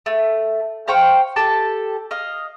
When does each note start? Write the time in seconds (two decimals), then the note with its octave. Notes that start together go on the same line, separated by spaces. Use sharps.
0.06 A3
0.88 C5 F5 G5 C#6
1.36 G4 A4 A5
2.11 D#5 F5